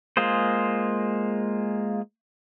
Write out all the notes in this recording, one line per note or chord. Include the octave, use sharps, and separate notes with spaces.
G#3 A#3 F4 G#4 C5